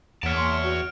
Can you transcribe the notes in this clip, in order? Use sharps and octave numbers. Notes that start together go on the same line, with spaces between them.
E2 C#5 F#5 A5 F6 D7
C6
F#4